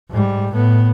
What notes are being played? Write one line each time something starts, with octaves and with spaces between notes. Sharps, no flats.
G#2 G3
A2 B3